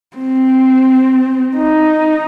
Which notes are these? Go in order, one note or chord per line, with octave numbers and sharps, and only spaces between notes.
C4
D#4